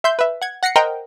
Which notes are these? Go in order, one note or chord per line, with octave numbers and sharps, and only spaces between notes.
E5 C6 G6
B4 E5
F#5 G#6
F#5 A#6 C7 C#7
A#4 C5 D#5 F#5 G5 A#5